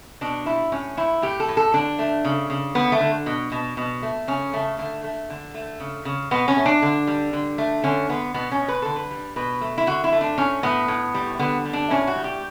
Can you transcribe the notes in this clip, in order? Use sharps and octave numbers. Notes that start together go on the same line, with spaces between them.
B2 D4
G3 E4
A2 C#4
A2 E4
A2 G4
A4
A2
A4
D3 D4
A3
C#3
C#3
D3 B3
A3
D3
B2
B2
B2
A3
C#3 C#4
C#3 A3
D3 A3
A3
D3
A3
C#3
C#3
B2 B3
C#4
A3
D4
D3
G3
D3
A3
D3 C#4
D3 B3
B2 B3
C#4
B2
B4
D3 A4
B4
G3
B2 B4
A3
E4
D3 F#4
E4
A3
D4
A2 C#4
A2 B3
A2
G3
D3 B3
G3
D4
A2 C#4
F#4
G3
G4